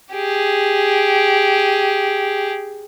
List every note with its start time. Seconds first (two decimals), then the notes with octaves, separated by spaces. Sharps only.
0.14 G4 G#4